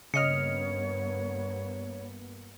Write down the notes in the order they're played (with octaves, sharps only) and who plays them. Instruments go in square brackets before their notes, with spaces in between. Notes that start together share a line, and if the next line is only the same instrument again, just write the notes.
[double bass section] G2 A#3 B3 [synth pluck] C#3 D#5 F6 [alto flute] C#5 [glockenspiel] C#7